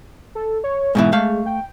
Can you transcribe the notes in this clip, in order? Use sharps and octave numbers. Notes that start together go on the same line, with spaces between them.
A4
C#5
G#2 B2 E3 G#3
A3 F5
G5